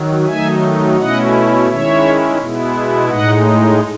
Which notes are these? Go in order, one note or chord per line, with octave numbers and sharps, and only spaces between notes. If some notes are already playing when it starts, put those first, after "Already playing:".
Already playing: D#3 F#3
D#3 F#3 A3 D#4 E5 G#5
B2 A3 C#4 E4 D#5 F#5
D#3 G#3 C#4 E4 C#5 E5
B2 G#3 B3 E4
A2 G#3 D#4 D#5 F#5